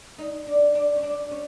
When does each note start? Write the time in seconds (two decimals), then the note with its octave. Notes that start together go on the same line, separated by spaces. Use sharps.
0.19 D#4
0.47 D4
0.75 D4
0.96 C#4
1.03 D4
1.31 C#4